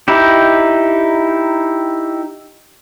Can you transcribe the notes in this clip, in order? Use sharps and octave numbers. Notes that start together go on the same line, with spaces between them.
D#4 E4 G4